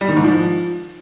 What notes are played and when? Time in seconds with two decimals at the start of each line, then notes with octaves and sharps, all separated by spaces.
0.01 G3
0.09 D#3
0.16 G#2
0.24 F3